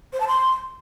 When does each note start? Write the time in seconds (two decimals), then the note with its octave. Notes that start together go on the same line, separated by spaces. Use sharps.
0.13 C5
0.20 A5
0.27 C6